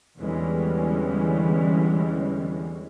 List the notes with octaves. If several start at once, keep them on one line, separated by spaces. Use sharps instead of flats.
E2 D3 E3 G3 G#3 C#4